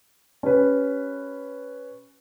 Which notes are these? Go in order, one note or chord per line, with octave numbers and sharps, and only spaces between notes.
C#4 G4 B4